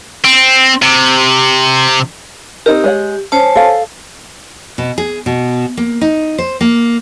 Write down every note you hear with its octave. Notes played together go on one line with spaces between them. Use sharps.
C4
C3
C4 D#4 G4 A#4
G#3 C#5 F#5
C#4 C5 C#5 A5
A4 F5
B2
G#4
B2
A#3
D#4
C5
A#3